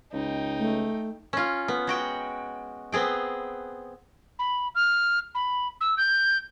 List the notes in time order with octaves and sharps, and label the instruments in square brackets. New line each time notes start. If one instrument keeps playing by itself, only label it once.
[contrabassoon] C#2 [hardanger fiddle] D#4 G5
[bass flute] A3
[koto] C#4 F4
B3
G#3 F#4 G5
B3 C4 G#4 G5
[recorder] B5
F6
B5
E6
G6